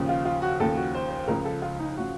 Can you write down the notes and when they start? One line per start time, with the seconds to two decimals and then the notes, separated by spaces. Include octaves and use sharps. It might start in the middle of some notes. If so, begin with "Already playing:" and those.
Already playing: D#2 C#3 F3
0.09 F4
0.25 F4
0.42 F#4
0.60 D#2 C#3 F3 A4
0.77 F#4
0.95 C5
1.10 C5
1.28 C#2 C#3 F3 A#4
1.45 A4
1.62 F4
1.79 D#4
1.97 C#3 F3 F#4